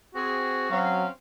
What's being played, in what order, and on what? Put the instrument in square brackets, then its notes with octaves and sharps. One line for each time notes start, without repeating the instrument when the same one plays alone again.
[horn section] C4 G#4 [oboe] F#4
[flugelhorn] F#3 [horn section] C4 C#4 F5